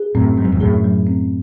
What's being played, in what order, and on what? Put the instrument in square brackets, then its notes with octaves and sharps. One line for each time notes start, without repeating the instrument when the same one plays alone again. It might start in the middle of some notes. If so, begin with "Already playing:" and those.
Already playing: [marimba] G#4
[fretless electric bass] F#2 A2 [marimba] C4
[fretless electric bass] G#2 [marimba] F#3
[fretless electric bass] F#2
E2 G#2
[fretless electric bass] F#2 A2 [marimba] G#4
[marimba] F#3
C4